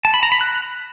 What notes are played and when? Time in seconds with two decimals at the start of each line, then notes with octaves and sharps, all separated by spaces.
0.05 A5
0.14 B5
0.23 A#5
0.32 B5
0.41 F#6